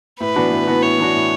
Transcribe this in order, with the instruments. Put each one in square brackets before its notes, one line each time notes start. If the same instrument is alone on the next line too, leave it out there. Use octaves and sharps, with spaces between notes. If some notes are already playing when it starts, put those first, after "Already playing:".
[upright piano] A2 [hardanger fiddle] B4
[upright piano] E3 B3 D4 F#4
A2
E3 B3 D4 F#4
[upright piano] A2 [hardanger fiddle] C#5
[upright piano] E3 B3 D4 F#4
A2